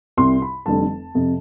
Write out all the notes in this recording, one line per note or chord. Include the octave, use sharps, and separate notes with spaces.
C2 C3 G3 C6
B5
F1 F2 D3 G3 C4 A5
F2 C3